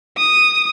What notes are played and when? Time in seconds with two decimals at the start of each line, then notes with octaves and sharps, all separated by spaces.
0.17 D#6